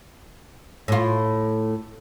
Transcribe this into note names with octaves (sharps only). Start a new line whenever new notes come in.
A2 F4